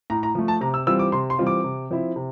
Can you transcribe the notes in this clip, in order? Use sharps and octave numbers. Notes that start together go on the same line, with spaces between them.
A2 A#5
A#5
F3 A3
A5
C3 A#5
E6
E3 G3 C4 F4 E6
D6
C3 C6
C6
E3 G3 C4 F4
D6
C3
F3 C4 E4
C3